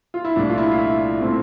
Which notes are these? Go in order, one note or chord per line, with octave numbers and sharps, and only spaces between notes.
F4
E4
C2 A#2 A3 D4
F4
E4
F4
E4
A#2 A3 C4